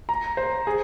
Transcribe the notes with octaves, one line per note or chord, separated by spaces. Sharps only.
A#5
C5
G#4